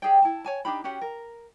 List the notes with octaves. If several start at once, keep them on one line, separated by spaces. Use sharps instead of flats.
G4 G#4 D5 G5
E4 A5
C#5 G#5 A5
D4 D#4 G4 B5
C#4 F#4 G4 F#5
A#4